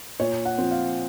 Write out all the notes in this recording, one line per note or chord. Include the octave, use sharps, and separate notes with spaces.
A#2 C#5
F#5
F3 C4
F5